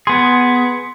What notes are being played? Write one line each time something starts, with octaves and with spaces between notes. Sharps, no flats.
B3 G#4 C6